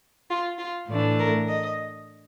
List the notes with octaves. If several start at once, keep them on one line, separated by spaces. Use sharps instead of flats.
F4
F4
A2 E3 A3 D4
A#4
D#5